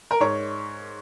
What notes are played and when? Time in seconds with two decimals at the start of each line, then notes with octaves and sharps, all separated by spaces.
0.11 A#4
0.20 G#2 C#5